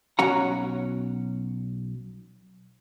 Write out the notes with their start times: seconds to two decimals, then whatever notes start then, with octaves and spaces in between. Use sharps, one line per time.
0.19 B1 F#3 C#4 F#5 A#5